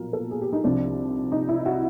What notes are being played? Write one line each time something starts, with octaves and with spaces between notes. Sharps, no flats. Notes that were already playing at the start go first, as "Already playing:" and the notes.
Already playing: B1 A#2 F3 A#4
A4
G#4
G4
D#4
C2 C3 F3 D4
D#4
E4
F#4